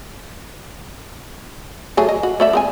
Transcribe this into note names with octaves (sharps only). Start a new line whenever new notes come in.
F#3 A3 G#4
D#5
F#4
A3 D5 E5
G#3 C4 G#5